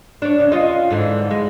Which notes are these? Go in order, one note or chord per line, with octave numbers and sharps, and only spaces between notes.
D4 C#5
C#3
C#4 F4 D#5
G#2 D3 E3
G#3